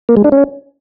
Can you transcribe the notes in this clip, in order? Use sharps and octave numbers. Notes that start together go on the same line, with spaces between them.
A#3
G#3
D4
C#4